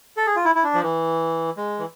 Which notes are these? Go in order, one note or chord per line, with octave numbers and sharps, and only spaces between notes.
A4
G#4
F4
E4
E4
D4
F3
E3
G#3
E3